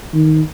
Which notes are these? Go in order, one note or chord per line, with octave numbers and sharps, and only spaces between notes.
D#3